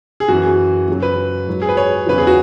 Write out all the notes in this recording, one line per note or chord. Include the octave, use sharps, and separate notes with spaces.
G#4
F#2 E3 F#4
F#2 C#3 F#3
B4
G#2 F#3
G#4
B4
C#5
E2 C#3 F#3 B4
G#4
F#4